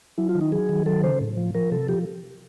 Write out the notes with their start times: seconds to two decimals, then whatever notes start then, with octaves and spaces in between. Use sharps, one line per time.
0.18 F#3 E4
0.29 F4
0.35 D#3
0.41 D#4
0.52 F#3 G#4
0.69 D#3
0.86 F#3 A4
1.03 C#3 C5
1.21 A2
1.37 F3
1.54 F3 A#4
1.72 C3 A4
1.88 F3 G4